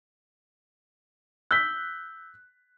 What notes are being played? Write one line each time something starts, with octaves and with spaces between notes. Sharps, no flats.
E6 F#6 G6 B6 G7